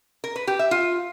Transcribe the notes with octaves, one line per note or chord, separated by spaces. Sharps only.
A#4
B4
G4
E5
F4